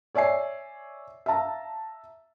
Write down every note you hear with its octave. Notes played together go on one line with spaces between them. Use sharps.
C#5 D5 E5 G#5 C7
E5 F5 A5 A#5